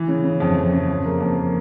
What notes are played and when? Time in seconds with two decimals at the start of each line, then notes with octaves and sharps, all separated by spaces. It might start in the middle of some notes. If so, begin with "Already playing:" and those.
Already playing: E3
0.08 C#3
0.24 C#3
0.40 F2
0.57 F2
0.72 C#3
0.88 F2
1.05 A#3
1.21 F2
1.36 A#3